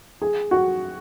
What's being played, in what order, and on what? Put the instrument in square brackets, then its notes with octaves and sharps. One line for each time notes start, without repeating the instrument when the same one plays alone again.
[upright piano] G#4
F#4